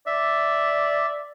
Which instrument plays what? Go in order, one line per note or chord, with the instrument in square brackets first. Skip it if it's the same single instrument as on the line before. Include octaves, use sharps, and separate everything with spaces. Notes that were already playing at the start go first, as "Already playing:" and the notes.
[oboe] D5 [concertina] E5